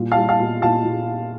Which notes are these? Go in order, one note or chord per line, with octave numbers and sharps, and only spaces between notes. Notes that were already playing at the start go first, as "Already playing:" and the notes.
Already playing: A#2 G3
F5 A5
G3
F5 A5
A#2
A#2 F5 A5
A#2